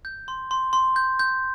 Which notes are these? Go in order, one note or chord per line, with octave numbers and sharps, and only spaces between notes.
G6
C6
C6
C6
G6
G6